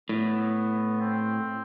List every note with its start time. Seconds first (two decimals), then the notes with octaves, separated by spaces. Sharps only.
0.09 A2 B3
1.01 C4